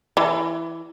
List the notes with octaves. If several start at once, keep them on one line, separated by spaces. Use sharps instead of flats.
E3